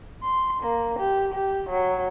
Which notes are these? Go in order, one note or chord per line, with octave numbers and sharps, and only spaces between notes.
C6
A#3
G4
G4
F#3